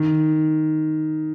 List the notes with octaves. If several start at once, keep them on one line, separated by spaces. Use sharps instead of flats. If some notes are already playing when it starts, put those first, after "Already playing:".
Already playing: D#3